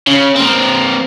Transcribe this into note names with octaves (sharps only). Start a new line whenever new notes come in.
C#3
A#3 C4